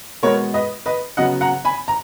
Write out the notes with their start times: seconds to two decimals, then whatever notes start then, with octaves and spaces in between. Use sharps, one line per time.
0.23 B2 G#3 B3 A#4 C#5
0.54 B4 D#5
0.86 B4 D#5
1.17 C#3 F#3 B3 D#5 F#5
1.41 F#5 A#5
1.65 G#5 B5
1.88 A#5